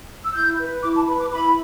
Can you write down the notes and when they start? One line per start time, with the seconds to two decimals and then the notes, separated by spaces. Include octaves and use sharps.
0.24 E6
0.34 E4 G6
0.59 B4
0.83 E4 D6
0.96 A5
1.07 B4 B5
1.20 D6
1.31 E4 B5